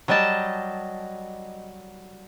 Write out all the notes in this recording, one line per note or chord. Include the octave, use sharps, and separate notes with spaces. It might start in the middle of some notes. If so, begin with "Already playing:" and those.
F#3 G3 D#5 G5 A5